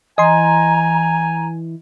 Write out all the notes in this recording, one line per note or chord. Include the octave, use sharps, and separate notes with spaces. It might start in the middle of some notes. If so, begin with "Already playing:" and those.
E3 D#5 G#5 A#5 C6